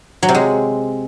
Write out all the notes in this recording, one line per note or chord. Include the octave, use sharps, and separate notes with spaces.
F#3
C3
G#3